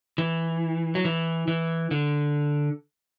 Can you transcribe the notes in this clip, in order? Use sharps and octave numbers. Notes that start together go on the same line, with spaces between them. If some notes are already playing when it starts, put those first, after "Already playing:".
E3
F#3
E3
E3
D3